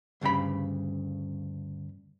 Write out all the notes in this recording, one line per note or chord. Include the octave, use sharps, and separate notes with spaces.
D2 G2 C#3 G5 B5